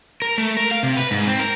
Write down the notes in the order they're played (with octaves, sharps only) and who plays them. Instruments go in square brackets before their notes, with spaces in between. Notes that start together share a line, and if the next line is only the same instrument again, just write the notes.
[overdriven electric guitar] A#4
A3
A#4
F5
C3
B4
G#2
C4
A#4